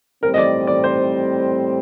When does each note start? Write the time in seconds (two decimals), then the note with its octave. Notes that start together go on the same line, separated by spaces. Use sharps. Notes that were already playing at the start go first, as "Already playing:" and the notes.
0.21 A2 G3 C4 A#4
0.34 D#5
0.38 D5
0.67 D5
0.84 C5